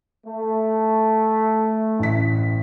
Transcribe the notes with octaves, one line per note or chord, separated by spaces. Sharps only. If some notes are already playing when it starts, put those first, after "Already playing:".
A3
A1 B6